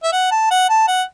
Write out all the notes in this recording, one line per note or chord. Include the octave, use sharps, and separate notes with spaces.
E5
F#5
A5
F#5
A5
F#5